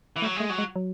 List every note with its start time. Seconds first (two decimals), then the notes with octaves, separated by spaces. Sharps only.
0.16 E3
0.22 F#3 A3
0.36 G#3 A3
0.50 F#3
0.58 G#3
0.76 F#3